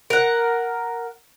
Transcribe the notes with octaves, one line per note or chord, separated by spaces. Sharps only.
A#4 F#5